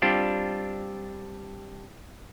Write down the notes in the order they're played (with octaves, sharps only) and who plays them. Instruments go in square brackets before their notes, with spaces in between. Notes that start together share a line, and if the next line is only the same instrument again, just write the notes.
[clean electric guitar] G3 C4 D4 F4 G4